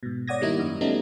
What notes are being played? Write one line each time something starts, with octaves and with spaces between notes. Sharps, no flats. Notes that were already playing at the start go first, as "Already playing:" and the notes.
G#2 B2
C#5 D5 F#5 D#6 G#6 A#6
D#3 G3 A#3 D#4 E4
F#2
C#3 F#3 G3 A3 B3 D#4